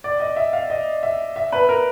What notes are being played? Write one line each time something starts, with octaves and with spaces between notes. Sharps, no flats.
D5
D#5
E5
F5
D#5
E5
E5
B4
A#4